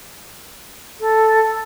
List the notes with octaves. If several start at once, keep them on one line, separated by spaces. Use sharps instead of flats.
A4